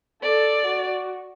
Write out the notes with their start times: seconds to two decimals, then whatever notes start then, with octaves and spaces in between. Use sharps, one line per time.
0.23 A4 D5
0.66 F#4